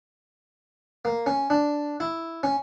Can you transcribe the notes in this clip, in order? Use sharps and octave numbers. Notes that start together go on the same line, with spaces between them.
A#3
C#4
D4
E4
C#4